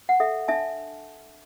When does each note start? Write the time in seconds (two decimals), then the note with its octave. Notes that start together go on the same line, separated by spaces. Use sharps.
0.09 F#5
0.20 A4 E5
0.48 D4 E5 A5